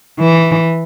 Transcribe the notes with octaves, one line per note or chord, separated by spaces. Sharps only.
E3